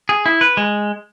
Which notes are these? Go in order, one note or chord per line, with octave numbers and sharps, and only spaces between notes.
G#4
E4
B4
G#3